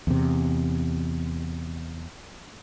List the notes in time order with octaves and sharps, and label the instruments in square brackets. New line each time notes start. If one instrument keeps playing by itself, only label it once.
[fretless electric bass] E2 C3